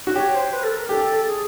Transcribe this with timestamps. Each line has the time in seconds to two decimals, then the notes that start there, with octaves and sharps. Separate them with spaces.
0.07 F#4
0.15 G4 C#5
0.34 C5
0.52 B4
0.63 A4
0.71 A#4
0.89 G4 A4
1.26 G#4